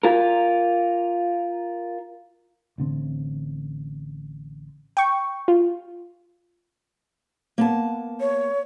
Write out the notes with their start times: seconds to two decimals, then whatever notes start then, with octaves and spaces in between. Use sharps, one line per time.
0.03 F4 A#4
2.78 A1 D3 C4
4.97 G5 C#6
5.48 F4
7.58 A#3 B3 A5
8.20 C#5